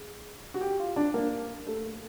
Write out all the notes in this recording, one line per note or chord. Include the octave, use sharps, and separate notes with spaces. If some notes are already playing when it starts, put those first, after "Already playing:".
Already playing: G#4
F#4
G4
F4
D4
A#3
A3